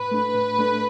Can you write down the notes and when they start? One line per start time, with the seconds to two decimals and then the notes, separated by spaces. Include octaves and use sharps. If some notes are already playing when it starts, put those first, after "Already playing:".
Already playing: A2 B4
0.11 A3 D4
0.35 A2
0.59 A3 D4